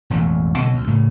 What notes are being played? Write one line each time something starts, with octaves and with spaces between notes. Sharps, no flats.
E1 A1 F2 E3
B2 D3 F3 F#3
D2
A2 C#3